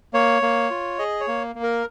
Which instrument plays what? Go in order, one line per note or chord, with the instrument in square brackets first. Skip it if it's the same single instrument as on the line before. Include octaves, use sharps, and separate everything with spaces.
[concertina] A#3 C#5
A#3
F4
G#4 D#5
C#5
A#3
A#3
A#4